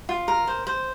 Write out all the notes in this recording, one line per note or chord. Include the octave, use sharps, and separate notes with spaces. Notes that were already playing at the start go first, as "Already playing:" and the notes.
F4
A#4
C5
C5